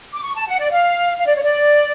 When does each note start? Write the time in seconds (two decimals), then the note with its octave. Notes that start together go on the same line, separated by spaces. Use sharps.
0.13 D6
0.22 C#6
0.34 A5
0.47 F#5
0.59 D5
0.71 F5
1.18 F5
1.27 D5
1.36 C#5
1.43 D5